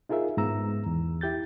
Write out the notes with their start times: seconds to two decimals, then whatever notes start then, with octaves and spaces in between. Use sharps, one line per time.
0.09 D#4 F4 G#4 A#4 E5
0.37 G#2 B3 A#5 E6
0.86 E2
1.21 E4 G4 G6 A6